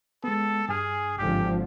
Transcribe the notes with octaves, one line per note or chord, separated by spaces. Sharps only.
G#3 B3 A4
G2 G#4 G#5 F6
G#1 D3 F3 G4